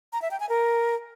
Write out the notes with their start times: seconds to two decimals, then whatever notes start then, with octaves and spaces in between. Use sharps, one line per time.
0.13 A#5
0.22 E5
0.31 G5
0.40 G#5
0.49 A#4